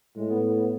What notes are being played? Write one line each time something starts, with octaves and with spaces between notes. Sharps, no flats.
A2 G#3
B3
B3
B3